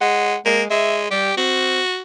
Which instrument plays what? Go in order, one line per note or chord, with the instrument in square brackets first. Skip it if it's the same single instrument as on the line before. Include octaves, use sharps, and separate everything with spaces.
[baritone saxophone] G#3 [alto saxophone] F#5
[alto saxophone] G#3 [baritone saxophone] A#3
[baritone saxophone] G#3 [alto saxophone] E5
[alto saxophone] G3 [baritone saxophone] G4
[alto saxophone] C4 [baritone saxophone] F#4